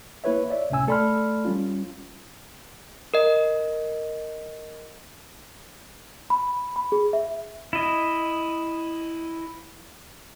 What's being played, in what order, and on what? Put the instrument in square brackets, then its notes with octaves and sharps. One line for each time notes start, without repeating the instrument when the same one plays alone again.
[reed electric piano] A#3 E4 B4 C#5 E5
C#5 D5 E5
C#2 A2 C3 C#4 G#5 E6
A3 A4 D5 B5 C6 F6
G3 C#4 F4
[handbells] A#4 D#5
[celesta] B5
B5
G#4
E5
[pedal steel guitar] E4 D#5